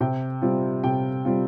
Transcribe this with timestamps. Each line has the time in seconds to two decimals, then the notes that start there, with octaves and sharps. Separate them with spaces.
0.01 C3 G5
0.42 G3 C4 F4
0.84 C3 G5
1.25 G3 C4 F4